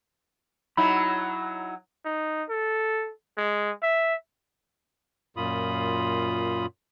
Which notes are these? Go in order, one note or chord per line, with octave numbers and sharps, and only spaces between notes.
F#3 D#4 E4 B5
D#4
A4
G#3
E5
F#2 A#2 F4 B5 D#6